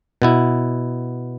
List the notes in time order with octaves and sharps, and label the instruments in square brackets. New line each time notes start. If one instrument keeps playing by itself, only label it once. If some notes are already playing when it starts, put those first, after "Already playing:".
[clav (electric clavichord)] B2 B3 E4